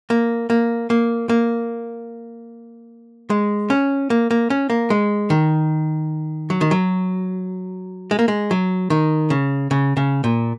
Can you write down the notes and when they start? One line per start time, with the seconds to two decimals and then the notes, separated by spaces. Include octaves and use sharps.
0.10 A#3
0.50 A#3
0.90 A#3
1.29 A#3
3.30 G#3
3.70 C#4
4.10 A#3
4.31 A#3
4.50 C#4
4.70 A#3
4.90 G#3
5.30 D#3
6.50 F#3
6.61 D#3
6.71 F#3
8.11 G#3
8.19 A#3
8.28 G#3
8.51 F#3
8.90 D#3
9.30 C#3
9.71 C#3
9.97 C#3
10.24 A#2